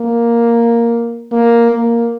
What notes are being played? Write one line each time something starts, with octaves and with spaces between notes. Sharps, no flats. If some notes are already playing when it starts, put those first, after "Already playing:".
Already playing: A#3
A#3
A#3